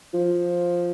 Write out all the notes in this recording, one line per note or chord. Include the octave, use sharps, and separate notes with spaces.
F3